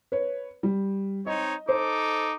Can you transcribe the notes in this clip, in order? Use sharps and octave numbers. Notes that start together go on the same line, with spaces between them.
B4 C#5
G3
C4 D#4 C#5 D#5
D#4 A4 C5 D6